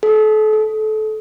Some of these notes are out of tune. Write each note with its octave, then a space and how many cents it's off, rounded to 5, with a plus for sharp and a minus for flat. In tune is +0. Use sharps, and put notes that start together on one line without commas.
A4 -35
A4 -25